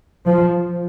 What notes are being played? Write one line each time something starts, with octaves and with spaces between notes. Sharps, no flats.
F3